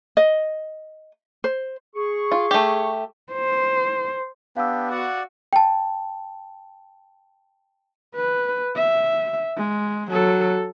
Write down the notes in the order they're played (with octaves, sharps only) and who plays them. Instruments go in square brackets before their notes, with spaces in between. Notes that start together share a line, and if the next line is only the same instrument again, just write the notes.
[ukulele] D#5
C5
[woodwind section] G#4 C#6
[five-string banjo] F4
A3 G4
[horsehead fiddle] C5
[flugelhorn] B3 [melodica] D4 G4 [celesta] F5 E6
[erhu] F#4 [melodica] D5 F#5
[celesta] G5 A5
[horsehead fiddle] B4
E5
G#3
F#3 A4